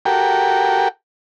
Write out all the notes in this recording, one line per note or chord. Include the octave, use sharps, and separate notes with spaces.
F#4 G4 A4 A#4 G5